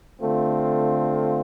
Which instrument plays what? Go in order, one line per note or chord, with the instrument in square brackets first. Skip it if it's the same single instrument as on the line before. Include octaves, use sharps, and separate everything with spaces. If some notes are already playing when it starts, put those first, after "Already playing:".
[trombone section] D3 A3 C4 F4